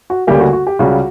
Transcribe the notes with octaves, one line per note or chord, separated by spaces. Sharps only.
F#4
D2 C#3 G3 A#3 G4
F#4
F#4
G4
C#2 C#3 G3 F#4